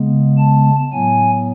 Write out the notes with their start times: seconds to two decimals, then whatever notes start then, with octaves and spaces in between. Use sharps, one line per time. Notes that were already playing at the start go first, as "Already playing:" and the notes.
Already playing: C#3 G#3 B3
0.38 A5
0.92 A2 F#3 B3 G#5